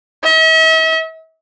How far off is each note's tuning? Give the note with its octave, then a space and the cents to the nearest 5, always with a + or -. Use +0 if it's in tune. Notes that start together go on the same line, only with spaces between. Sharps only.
E5 -45